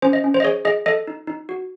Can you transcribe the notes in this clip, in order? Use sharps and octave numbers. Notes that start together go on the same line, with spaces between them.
C#4 C5
D#5
C#4
C5
D#5
G#4 C#5
G#4 D#5
A4 D#5
D#4
D#4
F#4